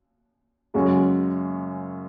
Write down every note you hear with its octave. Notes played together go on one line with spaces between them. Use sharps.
F#2 C#3 G#3 C#4 F#4